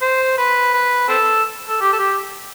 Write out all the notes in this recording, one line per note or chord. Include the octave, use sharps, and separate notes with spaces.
C5
B4
B4
C4 A4
A4
G4
A4
G4